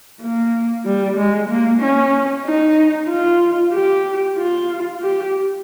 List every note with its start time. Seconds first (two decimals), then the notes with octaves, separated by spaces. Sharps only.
0.21 A#3
0.85 G3
1.17 G#3
1.49 A#3
1.81 C#4
2.45 D#4
3.10 F4
3.74 G4
4.37 F4
5.02 G4